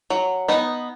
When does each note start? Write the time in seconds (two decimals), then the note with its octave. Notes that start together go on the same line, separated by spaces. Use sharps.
0.10 F#3
0.48 B3 D#4